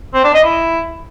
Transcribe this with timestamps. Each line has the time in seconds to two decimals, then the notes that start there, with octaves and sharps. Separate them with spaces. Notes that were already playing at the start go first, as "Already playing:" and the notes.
0.14 C4
0.24 D4
0.34 D#5
0.44 E4